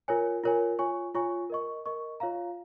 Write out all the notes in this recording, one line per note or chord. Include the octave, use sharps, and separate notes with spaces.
F4 A#4 C#5 G#5
F4 A#4 C#5 G#5
F4 C#5 G#5 C#6
F4 C#5 G#5 C#6
A#4 D#5 C#6
A#4 D#5 C#6
F4 C#5 F5 A#5